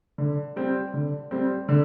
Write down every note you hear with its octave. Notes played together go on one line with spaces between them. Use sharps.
D3
G3 C4
D3
G3 C4
D3